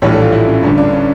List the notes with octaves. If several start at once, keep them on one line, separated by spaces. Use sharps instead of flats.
A#1 A2 E3 G3 C#5
A4
F4
E4
C#4
G1 G2 D3 C#4
D4
C#4